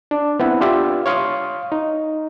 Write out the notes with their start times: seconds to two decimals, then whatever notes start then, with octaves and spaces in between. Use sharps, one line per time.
0.11 D4
0.40 B3 C4 E4 B4
0.61 D4 F4 G4 E5
1.06 C#5 F5 C6 C#6 D#6
1.72 D#4